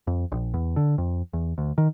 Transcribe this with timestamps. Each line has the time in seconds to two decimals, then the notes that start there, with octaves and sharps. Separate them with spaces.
0.07 F2
0.32 A#1
0.54 E2
0.76 D3
0.98 F2
1.33 E2
1.58 D2
1.78 D#3